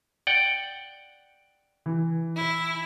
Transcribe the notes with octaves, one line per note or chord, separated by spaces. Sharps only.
D5 F#5 G5
E3
E4